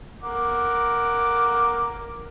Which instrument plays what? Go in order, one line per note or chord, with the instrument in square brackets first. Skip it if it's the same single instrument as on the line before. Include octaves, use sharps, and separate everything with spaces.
[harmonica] A#4 F#5 D6